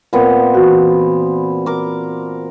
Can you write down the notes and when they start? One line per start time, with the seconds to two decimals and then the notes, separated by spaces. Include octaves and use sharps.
0.13 A#2 B3 C4 A#4
0.55 E3 F#4
1.66 A#4 D6